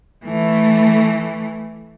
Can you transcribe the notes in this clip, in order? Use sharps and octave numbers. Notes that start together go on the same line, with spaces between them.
E3 A3